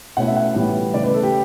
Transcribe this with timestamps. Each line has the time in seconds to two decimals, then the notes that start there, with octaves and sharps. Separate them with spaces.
0.17 B2 A3 C#4 E4 F#5
0.27 E5
0.37 F#5
0.55 A2 E3 G3 B3
0.94 C#3 E3 A3 C#4 D5
1.04 B4
1.14 A4
1.23 G4